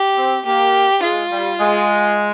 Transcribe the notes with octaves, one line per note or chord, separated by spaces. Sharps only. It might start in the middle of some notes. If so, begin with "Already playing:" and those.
Already playing: G4
C4
A#3 G4
G#3 F4
G3
G#3